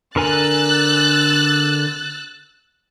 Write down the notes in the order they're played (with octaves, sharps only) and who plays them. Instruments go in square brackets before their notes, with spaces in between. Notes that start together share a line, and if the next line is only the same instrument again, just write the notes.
[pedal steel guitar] D3 A#4 G#5 [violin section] E6 F#6 A6